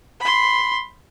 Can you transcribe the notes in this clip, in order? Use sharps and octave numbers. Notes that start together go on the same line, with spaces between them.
B5 C6